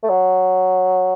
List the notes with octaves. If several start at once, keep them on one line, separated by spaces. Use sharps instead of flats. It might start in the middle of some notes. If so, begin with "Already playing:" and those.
A3
F#3